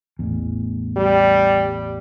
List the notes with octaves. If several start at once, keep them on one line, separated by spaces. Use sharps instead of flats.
A1 E2
G3